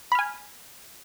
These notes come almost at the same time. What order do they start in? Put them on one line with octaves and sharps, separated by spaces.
B5 F6 G#5